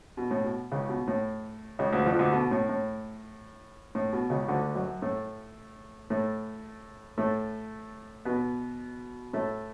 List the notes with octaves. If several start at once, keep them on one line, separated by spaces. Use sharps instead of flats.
B2
A2
B2
C#2 C#3
B2
A2
C#2 C#3
D2 D3
F2 F3
D2 D3
B2
A2
A2
A2
B2
C#2 C#3
D2 D3
F#2 F#3
A2 A3
A2 A3
A2 A3
B2 B3
A2 A3